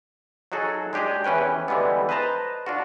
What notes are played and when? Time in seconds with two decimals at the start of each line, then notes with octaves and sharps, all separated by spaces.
0.52 F#3 D#4 F#4 G#4 A4
0.93 G#3 D4 G4 G#4 D#5
1.24 E2 E3 C#4 B4 G5
1.68 D3 E3 G3 G#3 B3
2.09 B4 C5 D#5 A5 A#5
2.66 D4 F4 F#4